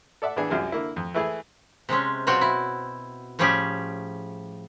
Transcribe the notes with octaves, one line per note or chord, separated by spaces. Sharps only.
A4 D5 E5 F#5
A2 E3 B3 D4 G#4
C2 F#2 C3 F4 G#4
D3 A#3 E4
F2
E3 A3 E4 G#4
C3 G#3 C4 C#4
B2 F#3 C4 F4 F#4 G5
E4
A2 F3 G3 C#4 G4 G#4